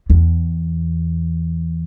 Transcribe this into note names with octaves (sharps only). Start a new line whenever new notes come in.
E2